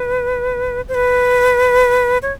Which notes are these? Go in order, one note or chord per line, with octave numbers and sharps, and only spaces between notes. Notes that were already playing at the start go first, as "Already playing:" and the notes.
Already playing: B4
C5
B4
C#5